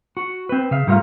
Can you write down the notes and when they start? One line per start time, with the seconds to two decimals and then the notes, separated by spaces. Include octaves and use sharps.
0.17 F#4
0.49 C4 B4
0.71 C#3 E5 F5
0.87 G#2 G3 A3 F4 A#4 F5